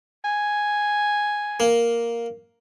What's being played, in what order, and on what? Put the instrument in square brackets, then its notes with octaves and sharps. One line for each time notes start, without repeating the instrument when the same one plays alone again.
[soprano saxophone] G#5
[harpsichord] A#3